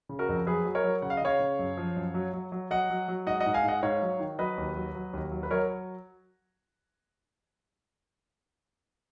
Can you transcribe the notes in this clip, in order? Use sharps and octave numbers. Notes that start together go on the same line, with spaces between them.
C#3
F#4 A#4
F2
F#3 G#4 B4
F#3
A#4 C#5
F#3
C#3 F#5
F5
D#5
C#3 C#5 F5
C#3
F#2
F3
F#2
F#3
F#3
F#3
F#3 D#5 F#5
F#3
F#3
G#2 D#5 F#5
D#5 F#5
G#2
F5 G#5
G#2 D#5 F#5
G#2 C#5 F5
F#3
D#3
F#3 B4 D#5
D#2
F#3
F#3
D#2
F#3
B4
F#3 A#4 C#5